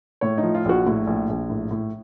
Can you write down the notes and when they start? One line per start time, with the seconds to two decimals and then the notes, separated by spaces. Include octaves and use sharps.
0.21 A2 C#5
0.38 D#4
0.43 F3
0.55 F4
0.65 A#1 F#4
0.87 A2
1.07 A#1
1.29 A#1
1.50 A2
1.71 A2